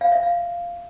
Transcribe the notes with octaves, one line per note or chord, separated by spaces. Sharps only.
F5
E5
F5